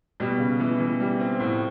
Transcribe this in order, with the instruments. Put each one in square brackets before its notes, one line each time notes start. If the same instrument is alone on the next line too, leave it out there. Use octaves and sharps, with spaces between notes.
[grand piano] B2 [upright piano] G3
[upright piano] C#3
E3
E3
G3
C4
[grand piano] A2 [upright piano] F3